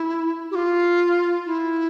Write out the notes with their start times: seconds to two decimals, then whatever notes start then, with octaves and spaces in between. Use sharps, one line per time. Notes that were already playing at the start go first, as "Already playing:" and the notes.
Already playing: E4
0.51 G4
0.55 F4
1.46 E4